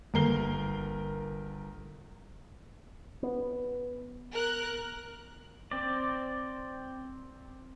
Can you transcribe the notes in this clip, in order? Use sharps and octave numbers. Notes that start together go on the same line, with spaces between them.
G1 A#3 A#4 C7 G7
B3
A#4 F#6
C4 D5